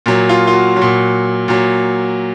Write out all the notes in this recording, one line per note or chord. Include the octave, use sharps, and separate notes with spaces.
A#2 F#3
F4
F4
F#4
F#3 F#4
A#2
A#2 F#3